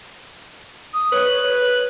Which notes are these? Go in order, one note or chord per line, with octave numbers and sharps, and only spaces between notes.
D#6
B4 C#5